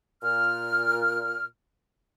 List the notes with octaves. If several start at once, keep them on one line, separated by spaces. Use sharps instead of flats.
A#2 F6